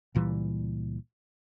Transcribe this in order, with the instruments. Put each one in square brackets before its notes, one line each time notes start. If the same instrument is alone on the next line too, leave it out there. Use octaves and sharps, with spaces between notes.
[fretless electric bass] C#2 A#2 E3 G3